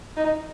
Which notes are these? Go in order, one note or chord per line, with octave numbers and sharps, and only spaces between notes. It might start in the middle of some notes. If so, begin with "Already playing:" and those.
D#4